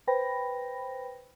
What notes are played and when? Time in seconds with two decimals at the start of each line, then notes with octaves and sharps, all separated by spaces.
0.07 B4 C5 G5 B5 A#6